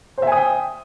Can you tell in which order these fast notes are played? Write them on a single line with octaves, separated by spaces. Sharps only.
C5 E5 G#5 D#6 G5